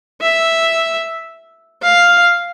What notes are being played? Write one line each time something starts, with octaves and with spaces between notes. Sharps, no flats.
E5
F5